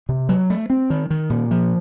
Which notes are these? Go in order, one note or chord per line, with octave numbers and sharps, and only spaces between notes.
C3
F#3
A3
C4
D#3
D#3
A#2
F3